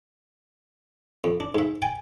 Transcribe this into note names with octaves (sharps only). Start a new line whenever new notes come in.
F2
D4
G#2 E5
G5 G#5